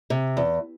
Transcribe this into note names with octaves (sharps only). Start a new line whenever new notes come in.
C3
E2